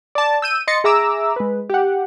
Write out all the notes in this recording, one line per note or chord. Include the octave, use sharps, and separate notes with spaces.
D5 A5
E6 G6 D#7
D#5 C6 A6 A#6 C#7
G#4 E5 A#5 D6 E6
G#3 B4
G4 F#5